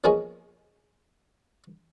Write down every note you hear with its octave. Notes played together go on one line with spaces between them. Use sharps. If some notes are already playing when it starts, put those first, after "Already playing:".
F3 A#3 B3 C#4 G#4 D#5